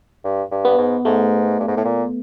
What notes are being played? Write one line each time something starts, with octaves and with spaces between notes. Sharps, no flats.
G2
G2
G2 B3
G#2
G#2 A3
G2
G#2
A2
A#2